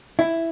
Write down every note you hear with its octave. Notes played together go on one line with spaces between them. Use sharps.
E4